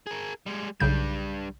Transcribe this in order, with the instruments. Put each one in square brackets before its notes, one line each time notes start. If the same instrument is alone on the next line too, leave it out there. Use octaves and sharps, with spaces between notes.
[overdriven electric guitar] G#4 A#4
G3 G#3
[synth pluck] B1 C#3 G6 [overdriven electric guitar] G3 D4